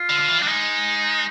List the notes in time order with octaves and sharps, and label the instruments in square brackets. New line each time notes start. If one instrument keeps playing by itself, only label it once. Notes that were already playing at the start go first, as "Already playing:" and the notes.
Already playing: [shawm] F4
[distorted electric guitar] D3
D3
E3
[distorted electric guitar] G3 [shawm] D4
[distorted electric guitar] G#3 [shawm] D#4